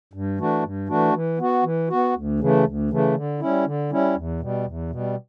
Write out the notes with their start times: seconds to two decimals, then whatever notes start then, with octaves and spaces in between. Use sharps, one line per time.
0.13 G2
0.38 E3 A3 D4 F#4
0.63 G2
0.88 E3 A3 D4 F#4
1.14 E3
1.39 B3 F#4
1.64 E3
1.90 B3 F#4
2.15 D2
2.40 C#3 E3 A3
2.65 D2
2.90 C#3 E3 A3
3.15 D3
3.40 G3 C#4 E4
3.65 D3
3.91 G3 C#4 E4
4.16 E2
4.40 B2 G3
4.66 E2
4.90 B2 G3